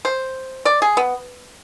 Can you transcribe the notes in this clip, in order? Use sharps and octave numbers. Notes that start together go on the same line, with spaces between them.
C5
D5
G#4
B3